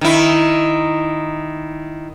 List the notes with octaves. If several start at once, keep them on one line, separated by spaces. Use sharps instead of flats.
D#3 E4